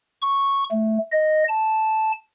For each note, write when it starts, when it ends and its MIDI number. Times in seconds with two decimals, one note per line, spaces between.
0.22 0.64 85
0.71 0.98 57
1.12 1.44 75
1.48 2.12 81